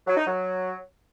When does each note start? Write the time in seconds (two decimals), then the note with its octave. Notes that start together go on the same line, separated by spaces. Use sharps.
0.07 F#3
0.17 D#4
0.27 F#3